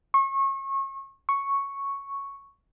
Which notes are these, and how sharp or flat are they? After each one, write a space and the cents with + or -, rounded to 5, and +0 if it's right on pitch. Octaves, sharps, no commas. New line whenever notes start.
C#6 -30
C#6 +0